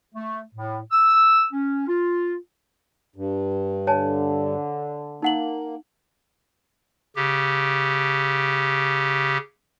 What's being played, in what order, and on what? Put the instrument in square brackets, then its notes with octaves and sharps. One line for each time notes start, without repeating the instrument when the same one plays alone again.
[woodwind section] A3
A2
E6
C#4
F4
[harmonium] G2
[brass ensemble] D3 [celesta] C#5 G#5 A5
[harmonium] A#3 [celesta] D#4 F#5 F#7
[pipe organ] C#3 G4